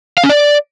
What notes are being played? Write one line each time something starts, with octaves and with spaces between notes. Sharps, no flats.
F5
C#4
D5